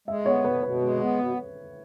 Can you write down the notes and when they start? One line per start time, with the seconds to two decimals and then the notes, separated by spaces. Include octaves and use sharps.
0.08 G#3 E5
0.26 B3 C#5
0.44 B2 B4
0.63 B2 B4
0.81 G#3
1.01 B3
1.19 B2